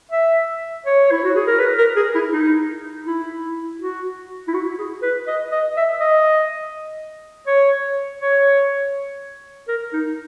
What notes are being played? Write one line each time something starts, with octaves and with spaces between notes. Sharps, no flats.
E5
C#5
E4
F#4
G#4
A#4
B4
A#4
G#4
E4
D#4
E4
F#4
E4
F#4
G#4
B4
D#5
D#5
E5
D#5
C#5
C#5
A#4
D#4